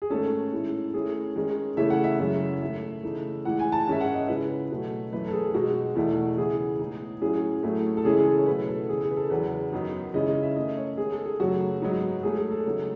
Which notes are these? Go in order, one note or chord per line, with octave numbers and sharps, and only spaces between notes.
G#4
G#2 D#3 A3 C#4 A4
A2 G#3 C#4 E4
D#3 A3 C#4 E4 G#4
D#3 G#3 C#4
C#3 E3 A3 C#4 E4 E5
F#5
E5
F#2 C#3 G#3 C#4 E4
G#2 D#3 A3 E5
C#3 E3 A3 D#4
A2 E3 G#3 F#5
G#5
A5
G#2 D#3 G#3 C#4 E5
F#5
D#5
C#3 G#3 C#4 E4 B4
B2 F#3 A3 C#4
F#2 E3 A3 E4 B4
A4
G#4
B2 G#3 D#4 F#4
E2 B2 A3 E4
C#3 E3 B3 E4 G#4
A2 G#3 B3 D#4
A2 F#3 C#4 E4 G#4
A2 F#3 A3 E4
A4
C#3 E3 G#3 C#4 E4 G#4
G#4
A4
C#5
B2 F#3 A3 E4 B4
A4
C#3 E3 B3 G#4
G#4
B4
A4
E2 C#3 F#3 B4
F#2 D#3 F#3 B3 D#4
C#3 G#3 C#4 E4 D#5
D#5
E5
D#3 A3 C#4 D#5
C#5
D#3 G#3 B3 G#4
A4
G#4
F#2 C#3 F#3 A3 F#4
G#2 F#3 B3 D#4
G#2 F#3 A3 G#4
G#4
A4
C#3 F#3 A3 D#4